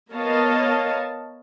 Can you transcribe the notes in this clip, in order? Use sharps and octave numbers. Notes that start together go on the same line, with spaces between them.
B3 A#4 C#5 D#5 F5 A5